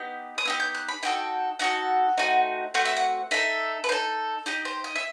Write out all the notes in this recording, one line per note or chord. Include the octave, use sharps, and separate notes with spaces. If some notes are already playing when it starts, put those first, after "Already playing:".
Already playing: B3 D#4 G4
D#6
B3 D#4 G4 E6
G6
F#6
B5
D#4 F#4 A4 G5
D#4 F#4 A4 F#5
A3 C4 D#4 F#4
A3 C4 F#4 F#5
E5
F#5
D#4 A4 E5
B4
D#4 A4 C5
D#4 G4 D#5
C5
D#5
E5